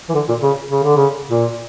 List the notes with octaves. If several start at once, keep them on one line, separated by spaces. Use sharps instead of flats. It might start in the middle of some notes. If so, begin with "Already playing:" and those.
E3
D3
A#2
C#3
C#3
D3
C#3
A#2